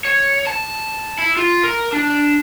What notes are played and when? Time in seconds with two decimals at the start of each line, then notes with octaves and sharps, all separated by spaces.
0.05 C#5
0.47 A5
1.18 E4
1.37 F4
1.63 A#4
1.93 D4